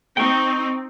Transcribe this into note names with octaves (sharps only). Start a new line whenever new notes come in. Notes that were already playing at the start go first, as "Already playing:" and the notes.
C4 D#4 G5 C#6